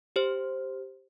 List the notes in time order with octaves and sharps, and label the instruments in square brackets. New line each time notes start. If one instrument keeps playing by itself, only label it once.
[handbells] G4 C5